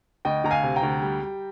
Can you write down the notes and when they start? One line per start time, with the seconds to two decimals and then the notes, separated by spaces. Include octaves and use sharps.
0.25 D2 D#5 G5
0.44 D2 A#5
0.51 F5 G#5
0.63 C3
0.76 G5 A#5
0.83 D2
1.02 G3
1.22 G3